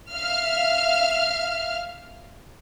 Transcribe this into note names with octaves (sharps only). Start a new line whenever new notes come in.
E5 F5 F6